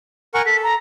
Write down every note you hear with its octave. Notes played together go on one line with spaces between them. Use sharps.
A#4 F#5 G#5 C#6
A4 B6
A#5